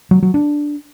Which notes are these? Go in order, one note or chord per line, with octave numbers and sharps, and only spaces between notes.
F#3
F#3
D4